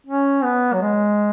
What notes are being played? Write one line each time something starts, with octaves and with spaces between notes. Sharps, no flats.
C#4
B3
F#3
G#3